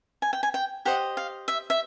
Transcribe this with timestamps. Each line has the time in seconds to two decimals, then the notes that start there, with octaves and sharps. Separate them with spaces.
0.22 G#5
0.33 G5
0.43 G#5
0.54 G5
0.85 G4 C5 D#5 F#5
1.17 F5
1.48 E5
1.70 E5